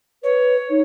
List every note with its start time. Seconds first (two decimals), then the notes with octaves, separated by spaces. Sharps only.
0.24 B4 C#5
0.70 D#4